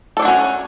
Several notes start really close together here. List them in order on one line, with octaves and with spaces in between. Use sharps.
A4 D5 D4 F#4 C#4